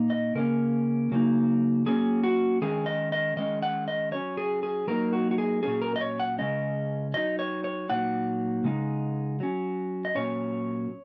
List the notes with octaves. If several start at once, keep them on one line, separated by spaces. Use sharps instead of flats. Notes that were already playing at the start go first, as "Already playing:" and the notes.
Already playing: A#2 A#3 D#4
D#5
C#3 A#3 C#4 A#4
C#3 F#3 A#3 D#4
F#3 A#3 C#4 G#4
F#4
D#3 G#3 C#4 G#4
D#5
D#5
D#3 G#3 C#4 D#5
F#5
D#5
F#3 C#4 C#5
G#4
G#4
F#3 A#3 D#4 A#4
F#4
F#4
G#4
A#2 F#3 C#4 G#4
A#4
D#5
C#5
F#5
C#3 G#3 C#4 D#5
F#3 D#4 D#5
C#5
C#5
A#2 F#3 A#3 D#4 F#5
C#3 G#3 D#4
F#3 C#4
D#5
A#2 F#3 C#4 C#5